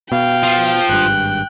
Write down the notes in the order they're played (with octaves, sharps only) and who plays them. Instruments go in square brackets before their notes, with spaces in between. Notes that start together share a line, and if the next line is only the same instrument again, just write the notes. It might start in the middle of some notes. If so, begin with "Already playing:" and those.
[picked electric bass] B2 [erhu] F5 [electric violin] G5
[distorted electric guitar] F3
[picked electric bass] G#1 G2 [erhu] F#6